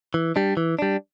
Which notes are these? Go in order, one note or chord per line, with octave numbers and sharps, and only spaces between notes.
E3
G3 D4
E3
G3 D4